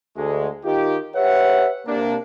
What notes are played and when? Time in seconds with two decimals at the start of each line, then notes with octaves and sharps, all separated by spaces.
0.17 D2 G#3
0.65 D#3 D#4 F4 G4
1.16 G4 B4 C#5 E5 F#5
1.87 C3 A#3 D4